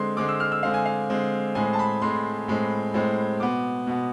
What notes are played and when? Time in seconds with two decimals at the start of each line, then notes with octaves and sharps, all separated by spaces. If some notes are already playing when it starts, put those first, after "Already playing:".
Already playing: D3 G#3 C4 C6
0.17 D3 G#3 C4 D6
0.28 E6
0.40 F6
0.52 E6
0.63 D3 G#3 C4 F5
0.74 G#5
0.86 F5
1.10 D3 G#3 C4
1.55 A2 G#3 C4 G#5
1.73 A5
1.79 B5
2.02 A2 G#3 C4 C6
2.48 A2 G#3 C4
2.94 A2 G#3 C4
3.40 B2 B3 D6
3.87 B2 B3